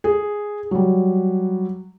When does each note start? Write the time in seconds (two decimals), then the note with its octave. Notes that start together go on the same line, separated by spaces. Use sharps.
0.04 G#4
0.71 F#3 G3